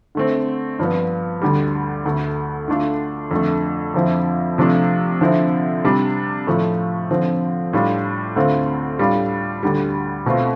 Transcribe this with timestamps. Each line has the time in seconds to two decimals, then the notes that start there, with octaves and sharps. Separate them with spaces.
0.15 D3 A3 C4
0.79 G2 F3 B3
1.42 D2 D3 G3
2.05 D2 D3 A3
2.68 D3 A3 D4 F4
3.31 F2 D3 A3
3.94 F2 D3 F3 C4 E4
4.58 C3 F3 A3 D4 F4
5.21 D3 F3 C4 E4
5.84 C3 G3 D4
6.47 A2 F3 A3
7.11 D3 F3 C4
7.73 A2 G3 D4 F4
8.36 D2 D3 A3 C4 F4
8.99 A2 G3 D4 F4
9.63 D2 D3 G3
10.26 B2 A3 C4 F4